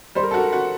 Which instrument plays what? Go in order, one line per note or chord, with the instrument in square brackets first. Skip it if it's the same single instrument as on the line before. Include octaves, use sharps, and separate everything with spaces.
[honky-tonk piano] G3 [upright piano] C5
[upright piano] A#4
A4
[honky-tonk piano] F#4 [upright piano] A#4
[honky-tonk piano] F#4